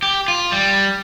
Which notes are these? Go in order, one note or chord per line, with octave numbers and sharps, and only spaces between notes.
G4
F4
G3